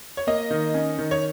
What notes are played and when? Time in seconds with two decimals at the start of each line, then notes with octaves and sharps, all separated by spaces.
0.17 C#5
0.27 A#3 D#5
0.51 D#3
0.74 C#4
0.98 D#3
1.11 C#5